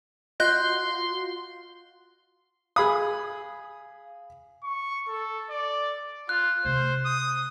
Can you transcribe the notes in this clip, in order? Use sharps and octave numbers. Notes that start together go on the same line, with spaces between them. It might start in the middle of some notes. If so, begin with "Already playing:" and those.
F4 F#4 D#5 C6 F#6 G6
G#4 F5 B5 D#6
C#6
A4
D5
F4 F#6
C3 A3 C5
D#6